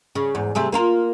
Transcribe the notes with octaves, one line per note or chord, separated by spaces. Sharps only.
C#3
E2 G#2
C3 A3 G#4
A#3 F4 A#4